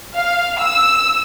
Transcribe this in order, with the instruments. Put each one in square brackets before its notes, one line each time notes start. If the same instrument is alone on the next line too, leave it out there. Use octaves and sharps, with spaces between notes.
[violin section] F5
E6